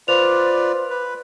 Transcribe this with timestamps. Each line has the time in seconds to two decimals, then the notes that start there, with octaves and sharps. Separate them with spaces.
0.08 F4 B4 C5 D5 F7
0.90 B4